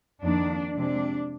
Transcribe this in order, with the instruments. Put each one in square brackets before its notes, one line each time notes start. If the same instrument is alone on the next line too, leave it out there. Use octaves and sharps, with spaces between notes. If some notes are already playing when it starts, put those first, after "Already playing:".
[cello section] F2 D#3 A#3 D4
C3 F3 G#3 D4